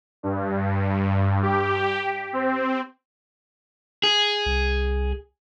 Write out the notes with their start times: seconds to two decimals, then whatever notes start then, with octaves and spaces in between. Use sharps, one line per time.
0.23 G2
1.43 G4
2.33 C4
4.03 G#4
4.46 C2